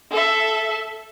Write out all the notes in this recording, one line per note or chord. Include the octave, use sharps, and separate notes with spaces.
A4 E5